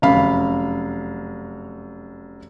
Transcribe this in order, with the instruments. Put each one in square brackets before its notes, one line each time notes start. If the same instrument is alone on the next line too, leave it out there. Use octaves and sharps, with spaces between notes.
[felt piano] F1 F#2 F5 B5